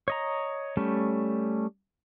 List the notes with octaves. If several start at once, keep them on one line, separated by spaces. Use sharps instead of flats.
C#5 D#5 A#5
G3 A3 C#4